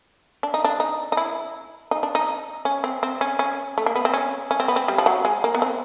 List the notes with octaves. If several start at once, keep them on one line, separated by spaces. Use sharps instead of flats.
D4
D#4
D4
D#4
D#4
E4
D#4
D4
D#4
C#4
C4
C4
C#4
C#4
A3
A#3
B3
C4
C#4
C#4
C4
B3
C4
G3
F3
F#3
G#3
A#3
B3
C4